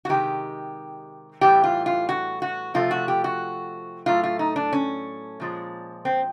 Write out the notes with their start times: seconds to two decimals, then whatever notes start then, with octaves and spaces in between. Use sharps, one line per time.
0.05 F#4
0.09 C3 D#3 G#3 G4
1.41 A2 E3 G3 G4
1.64 F4
1.86 F4
2.09 F#4
2.42 F#4
2.74 C3 F3 A3 F4
2.91 F#4
3.08 G4
3.24 F#4
4.06 A2 F#3 A3 F4
4.24 F4
4.39 D#4
4.56 D4
4.73 C#4
5.40 A#2 F3 G#3
6.05 C4